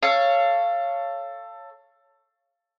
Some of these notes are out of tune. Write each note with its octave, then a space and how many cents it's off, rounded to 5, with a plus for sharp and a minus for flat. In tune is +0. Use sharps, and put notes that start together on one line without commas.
A4 +15 C#5 +0 F5 -15